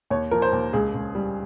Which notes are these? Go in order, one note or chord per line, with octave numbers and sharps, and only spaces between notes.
D#2 C#5
F3 A#4
C5
D#2
C#2 G#4
C#2
G3